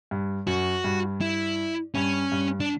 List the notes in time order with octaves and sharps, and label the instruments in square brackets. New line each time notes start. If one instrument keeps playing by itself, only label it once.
[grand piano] G2
[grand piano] F#2 [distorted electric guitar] F#4
[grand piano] G2
[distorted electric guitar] E4
[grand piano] G2 [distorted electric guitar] C#4
[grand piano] G2
[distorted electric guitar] D4